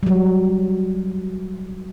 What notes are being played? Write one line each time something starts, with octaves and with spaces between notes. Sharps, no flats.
F#3 G3